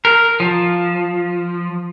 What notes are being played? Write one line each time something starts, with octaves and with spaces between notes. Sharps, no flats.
A#4
F3